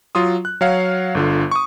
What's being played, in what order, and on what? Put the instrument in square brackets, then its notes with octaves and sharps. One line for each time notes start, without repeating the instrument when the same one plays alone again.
[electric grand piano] F#3 F4 C6 D#6
F#6
F#3 C#5 F5 F#5
G1 D3 F4
C#6 D#6